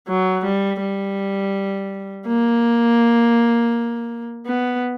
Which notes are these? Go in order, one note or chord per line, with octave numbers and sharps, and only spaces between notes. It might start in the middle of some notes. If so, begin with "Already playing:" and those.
F#3
G3
G3
A#3
B3